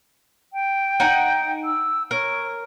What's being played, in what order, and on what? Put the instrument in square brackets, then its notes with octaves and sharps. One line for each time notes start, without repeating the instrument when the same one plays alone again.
[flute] G5
[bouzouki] D#4 F#5 G#5
[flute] E6
[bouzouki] A#4 [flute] C#5